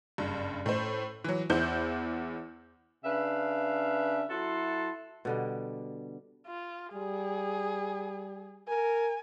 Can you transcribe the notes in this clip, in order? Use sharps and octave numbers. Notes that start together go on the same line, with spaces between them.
F#1 G2
A2 C5
E3 F#3
E2 E4 C5 G6
C#3 D4 B4 E5 F5
F#3 E4 F#4 A4 C6
B2 D3 G3
F4
G3 G#4
A#4 G#5